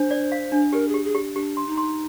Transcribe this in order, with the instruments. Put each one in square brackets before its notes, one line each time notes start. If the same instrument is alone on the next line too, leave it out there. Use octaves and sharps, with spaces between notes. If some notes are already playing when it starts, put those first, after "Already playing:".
Already playing: [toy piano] D4 [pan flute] C5
[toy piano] D5
F5
D4
[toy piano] G4 [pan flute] A#4
[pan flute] G#4
[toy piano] G4
[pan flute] G#4
[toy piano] G4
[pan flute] D4 [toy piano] G4
[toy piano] C6
[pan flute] D#4
[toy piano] C6